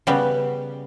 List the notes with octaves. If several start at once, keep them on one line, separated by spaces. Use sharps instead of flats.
C#3 G3 B3